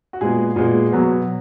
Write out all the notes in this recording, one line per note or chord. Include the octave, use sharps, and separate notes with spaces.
F#4
A#2 G#3 B3 G#4
A#2 G#3 B3
B2 F#3 B3